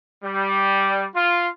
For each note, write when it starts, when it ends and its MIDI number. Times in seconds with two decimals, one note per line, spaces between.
0.24 1.06 55
1.14 1.49 65